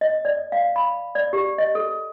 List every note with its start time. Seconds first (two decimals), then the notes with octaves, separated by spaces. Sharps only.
0.01 D#5
0.25 D5
0.52 F5
0.76 B5
1.15 D5
1.33 G4
1.58 D#5
1.75 A4